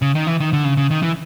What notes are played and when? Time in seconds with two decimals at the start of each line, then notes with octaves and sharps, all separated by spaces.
0.02 C#3
0.15 D#3
0.27 E3
0.40 D#3
0.53 D3
0.65 C#3
0.77 C#3
0.91 D#3
1.03 E3